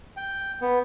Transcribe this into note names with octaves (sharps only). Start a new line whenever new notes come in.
G5
B3